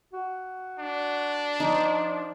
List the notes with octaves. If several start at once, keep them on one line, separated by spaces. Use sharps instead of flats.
F#4
D4
F3 D#4